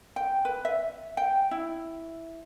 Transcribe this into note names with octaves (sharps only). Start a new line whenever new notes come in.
G5
B4
E5
G5
E4